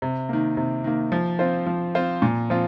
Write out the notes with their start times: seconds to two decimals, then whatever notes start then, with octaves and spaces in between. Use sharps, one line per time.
0.02 C3
0.29 D#3 A#3
0.57 C3
0.84 D#3 A#3
1.12 F3
1.39 C4 F4 C5
1.66 F3
1.95 C4 F4 C5
2.22 A#2
2.50 F3 C4 F4